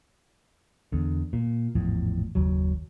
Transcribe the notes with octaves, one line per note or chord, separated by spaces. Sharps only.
E2 D3
A#2
G#1 E2 A2 F3
F#1 D#2 F#3